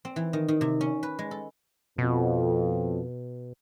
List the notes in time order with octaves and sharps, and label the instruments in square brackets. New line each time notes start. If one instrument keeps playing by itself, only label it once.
[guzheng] C4
E3
D#3
D#3
C3
C#4
B4
G#3
A4
[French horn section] F2 [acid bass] B2